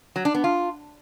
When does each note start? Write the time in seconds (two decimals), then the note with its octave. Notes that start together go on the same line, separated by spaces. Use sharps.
0.16 F#3
0.25 D4
0.34 B3
0.44 F4